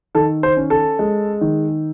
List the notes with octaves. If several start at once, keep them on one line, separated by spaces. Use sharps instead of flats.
D#3 A4
C5
C#4
A4
G#3
D#3